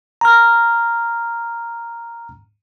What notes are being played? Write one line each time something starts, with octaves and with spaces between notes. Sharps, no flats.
A#5 F6